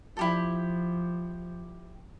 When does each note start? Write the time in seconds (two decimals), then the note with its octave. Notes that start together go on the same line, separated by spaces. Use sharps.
0.17 F3 E4 G4 A4